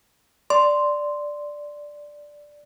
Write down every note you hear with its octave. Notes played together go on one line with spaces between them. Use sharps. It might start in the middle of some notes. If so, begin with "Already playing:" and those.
D5 C6